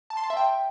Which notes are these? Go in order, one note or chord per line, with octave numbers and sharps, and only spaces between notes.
A5
C6
A5
E5
G5